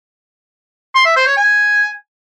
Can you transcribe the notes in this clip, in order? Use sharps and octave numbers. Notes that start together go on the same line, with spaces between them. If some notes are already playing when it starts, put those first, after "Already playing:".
C6
E5
C5
C#5
G#5